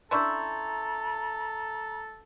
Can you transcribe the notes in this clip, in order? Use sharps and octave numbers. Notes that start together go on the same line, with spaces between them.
C#4 D4 E4 A4 A#5 C6 C#6 G6